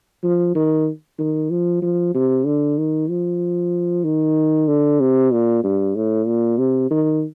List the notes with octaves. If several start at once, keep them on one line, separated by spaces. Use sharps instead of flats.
F3
D#3
D#3
F3
F3
C3
D3
D#3
F3
D#3
D3
C3
A#2
G2
A2
A#2
C3
D#3